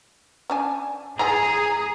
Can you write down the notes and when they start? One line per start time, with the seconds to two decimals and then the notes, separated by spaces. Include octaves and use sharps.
0.50 C#4 D4 G#5
1.19 E3 F4 G#4 G#5 A#5